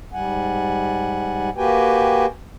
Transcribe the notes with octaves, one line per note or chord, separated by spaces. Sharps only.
G#2 G3 F#5 G#5
A#3 F#4 G4 B4 G5 G#5